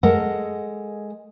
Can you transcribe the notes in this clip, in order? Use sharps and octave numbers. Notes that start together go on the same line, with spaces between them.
G#3 A4 A#4 F#5